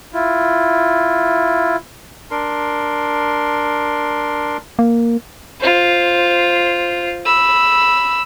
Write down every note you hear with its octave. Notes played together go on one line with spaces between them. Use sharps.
E4 F4
D4 A#4 C6
A#3
F4 C5
B5 E6